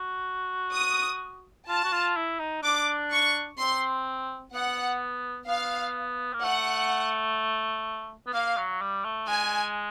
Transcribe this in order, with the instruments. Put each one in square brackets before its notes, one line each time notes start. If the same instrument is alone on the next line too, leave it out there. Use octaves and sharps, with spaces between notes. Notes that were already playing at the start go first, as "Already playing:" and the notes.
Already playing: [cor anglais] F#4
[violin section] D#6
[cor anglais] F4 [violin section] A5
[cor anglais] F#4
F4
E4
D#4
[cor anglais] D4 [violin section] D6
[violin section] C#6
[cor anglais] C4 [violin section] C6
[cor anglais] B3 [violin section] F#5
[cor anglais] B3 [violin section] F5
[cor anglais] A#3
[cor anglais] A3 [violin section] F#5
[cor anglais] B3
[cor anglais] A#3 [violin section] F5
[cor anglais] F#3
G3
A3
[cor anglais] G#3 [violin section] G#5